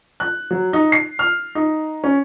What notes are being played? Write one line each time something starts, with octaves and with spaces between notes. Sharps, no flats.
F#6
F#3
D#4
C7
F6
D#4
C#4